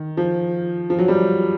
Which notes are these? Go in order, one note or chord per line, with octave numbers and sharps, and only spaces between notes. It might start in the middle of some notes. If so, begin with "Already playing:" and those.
Already playing: D#3
F3
F3
F#3
G3